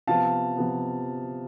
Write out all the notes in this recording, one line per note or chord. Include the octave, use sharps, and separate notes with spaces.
C3 F3 B3 F5 A5
C3 F3 B3